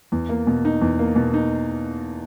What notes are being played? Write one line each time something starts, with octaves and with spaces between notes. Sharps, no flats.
E2
A#3
B2
D#4
E2
A#3
B2
D#4